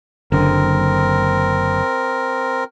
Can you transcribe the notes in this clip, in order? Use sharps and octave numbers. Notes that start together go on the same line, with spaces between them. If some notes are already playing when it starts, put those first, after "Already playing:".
F#1 D3 C4 A#4